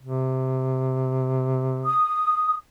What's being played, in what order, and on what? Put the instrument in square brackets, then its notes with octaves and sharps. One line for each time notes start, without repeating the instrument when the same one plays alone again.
[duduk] C3
[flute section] D#6